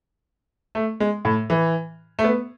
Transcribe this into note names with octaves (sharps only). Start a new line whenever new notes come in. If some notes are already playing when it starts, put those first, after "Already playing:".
A3
G#3
A2
E3
A3
B3